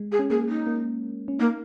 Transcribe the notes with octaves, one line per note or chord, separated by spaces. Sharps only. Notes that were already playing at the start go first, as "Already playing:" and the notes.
Already playing: G#3
G#4
C#4
A#3 G#4
D#4
A#3
C#4
A#3 D#4